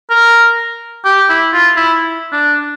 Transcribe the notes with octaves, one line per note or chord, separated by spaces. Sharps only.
A#4
G4
E4
F4
E4
D4